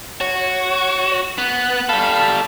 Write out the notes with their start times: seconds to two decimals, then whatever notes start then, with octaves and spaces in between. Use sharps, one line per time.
0.21 F#4 C#5
1.38 B3 F#6
1.89 G3 A4 F5 B5